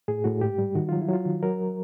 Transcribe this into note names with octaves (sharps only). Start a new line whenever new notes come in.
A2 G#4
A2 F#4
G#2 G4
G3
D#3 F#4
F#3 F4
E4
F#3 F4
D#3
F#3 A#4